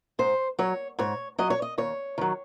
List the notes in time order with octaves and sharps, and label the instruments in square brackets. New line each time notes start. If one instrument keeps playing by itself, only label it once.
[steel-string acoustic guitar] G#2 C5
F#3 C#5
G#2 C#5
F#3 D#5
C#5
D#5
D#2 C#5
D#3 F#3